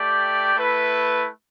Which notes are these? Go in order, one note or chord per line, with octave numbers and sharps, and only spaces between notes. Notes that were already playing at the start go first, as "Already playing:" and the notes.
Already playing: A3 G4 D5 G5
A3 E4 B4